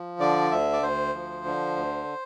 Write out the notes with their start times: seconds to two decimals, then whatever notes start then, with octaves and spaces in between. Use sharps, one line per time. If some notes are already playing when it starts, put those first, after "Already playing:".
Already playing: F3
0.19 D3 D5
0.51 D2 E5
0.73 D5
0.83 D2 C5
1.14 F3
1.45 D3
1.76 D2